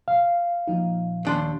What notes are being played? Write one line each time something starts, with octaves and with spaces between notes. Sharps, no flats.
F5
A#2 F3 D#4
D#2 D4 C6